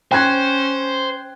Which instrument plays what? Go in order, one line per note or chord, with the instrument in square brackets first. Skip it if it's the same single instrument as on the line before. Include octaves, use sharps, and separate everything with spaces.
[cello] C#4 [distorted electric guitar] C5 [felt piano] G5 F#6 G#6